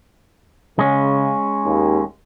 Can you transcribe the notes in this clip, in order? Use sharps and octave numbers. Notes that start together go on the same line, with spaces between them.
C#3 G#3 C#4
D#2